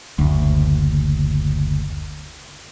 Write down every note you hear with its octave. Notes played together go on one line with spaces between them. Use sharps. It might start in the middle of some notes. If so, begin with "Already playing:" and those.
F#1 D2